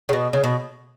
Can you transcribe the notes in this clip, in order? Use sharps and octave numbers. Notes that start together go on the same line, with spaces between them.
C#3
B2
C#3
B2